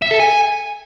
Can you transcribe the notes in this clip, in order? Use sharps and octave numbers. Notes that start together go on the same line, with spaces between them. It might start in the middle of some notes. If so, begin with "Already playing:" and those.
E5
A4
G#5